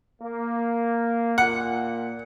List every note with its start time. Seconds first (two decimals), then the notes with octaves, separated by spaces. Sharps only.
0.22 A#3
1.38 A#2 F#5